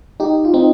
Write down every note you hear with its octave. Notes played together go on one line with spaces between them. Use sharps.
D#4 G4
F4
C4 D#4